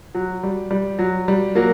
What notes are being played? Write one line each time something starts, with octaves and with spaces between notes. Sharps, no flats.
F#3
G3
G3
F#3
G3
F#3 A#3